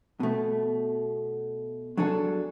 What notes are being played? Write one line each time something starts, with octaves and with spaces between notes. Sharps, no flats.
B2 A3
F#3 D4 G#4 A4